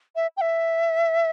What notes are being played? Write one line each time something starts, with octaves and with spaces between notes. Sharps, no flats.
E5
G5
E5